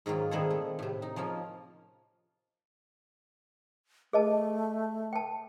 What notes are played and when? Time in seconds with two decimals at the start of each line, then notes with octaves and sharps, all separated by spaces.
0.06 G#2 D#3 F#3 A#3 F4
0.31 A#2 D#3 B3 C4 G#4 A4
0.50 A3
0.79 A2 C3
1.02 D#4
1.16 F3 A#3 C#4 F4
4.13 A3 G#4 D#5 A5
5.13 G5 A5